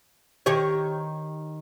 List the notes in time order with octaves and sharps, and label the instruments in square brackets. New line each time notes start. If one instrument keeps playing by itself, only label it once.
[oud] D#3 G4 C#5